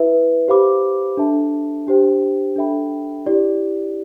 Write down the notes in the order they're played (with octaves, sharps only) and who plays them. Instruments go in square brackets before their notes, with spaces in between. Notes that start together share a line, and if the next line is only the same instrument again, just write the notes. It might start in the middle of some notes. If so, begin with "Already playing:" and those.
Already playing: [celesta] E4 B4 E5
G4 C5 F5 B5 D6
D4 A4 E5 A5
D4 G4 C5 G5
D4 A4 E5 G5 B5
E4 G4 D5